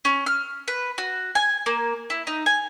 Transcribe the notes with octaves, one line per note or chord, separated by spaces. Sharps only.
C#4
F6
B4
F#4
G#5
A#3
E4
D#4
G#5